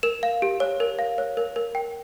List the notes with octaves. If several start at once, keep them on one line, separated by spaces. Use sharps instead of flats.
A#4 E7
F5
G4
C#5
A#4
F5
C#5
A#4
A#4
G5